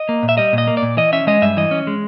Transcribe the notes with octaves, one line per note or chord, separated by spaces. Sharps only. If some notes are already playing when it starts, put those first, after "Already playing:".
Already playing: D#5
A#3
A#2
E5
G3 D#5
A#2
D#5
A#3
D5
A#2
E3 D#5
C#4 E5
G#3 D#5
G2 E5
E3 D#5
C#4
G#3